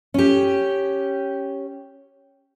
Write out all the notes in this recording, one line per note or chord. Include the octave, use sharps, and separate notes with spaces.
C#4 G4